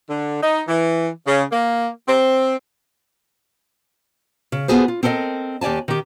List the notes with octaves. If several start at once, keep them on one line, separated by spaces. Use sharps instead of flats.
D3
D#4
E3
C#3
A#3
C4
C#3
B3 F4 F#4 G#4 A4 C5
F4
C4 A4 A#4 D5 D#5
D#2 G4 D5 G#5 A5
D#3 G4